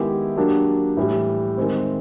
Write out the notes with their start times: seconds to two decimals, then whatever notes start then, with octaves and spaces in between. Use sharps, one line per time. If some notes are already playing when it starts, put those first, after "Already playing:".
Already playing: D#3 G#3 B3 E4 G4
0.37 F#3 A#3 D4 G4
0.97 A2 E3 G3
1.58 D#3 G#3 C4